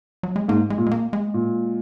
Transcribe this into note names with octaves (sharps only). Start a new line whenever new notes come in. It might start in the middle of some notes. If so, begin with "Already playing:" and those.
F#3
G#3
G#2 A#3
G#3
A#2
G#3
A#3
G#3
A#2